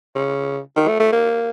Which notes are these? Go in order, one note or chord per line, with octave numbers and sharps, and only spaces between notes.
C#3
D#3
A3
A3
A#3